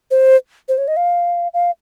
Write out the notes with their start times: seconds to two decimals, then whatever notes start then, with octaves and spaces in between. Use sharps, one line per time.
0.11 C5
0.69 C5
0.78 C#5
0.88 D#5
0.97 F5
1.54 F5